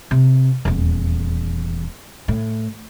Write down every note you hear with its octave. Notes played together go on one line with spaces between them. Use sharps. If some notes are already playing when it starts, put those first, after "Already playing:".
C3
D#1 E2
A2